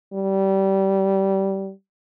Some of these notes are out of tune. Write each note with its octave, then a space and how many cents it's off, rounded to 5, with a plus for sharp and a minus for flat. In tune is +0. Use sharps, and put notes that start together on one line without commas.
G3 -20